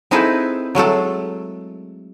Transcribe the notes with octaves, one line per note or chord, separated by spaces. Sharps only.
C4 D#4 E4 G#4 A4 B4
F#3 G#3 A3 A4